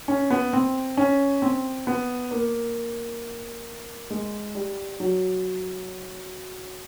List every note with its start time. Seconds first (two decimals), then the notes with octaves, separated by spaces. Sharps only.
0.08 C#4
0.31 B3
0.53 C4
0.97 C#4
1.42 C4
1.87 B3
2.31 A#3
4.10 G#3
4.55 G3
5.00 F#3